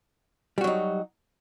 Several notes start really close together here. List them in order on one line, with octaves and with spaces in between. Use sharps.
G3 F#4 F#3 D#4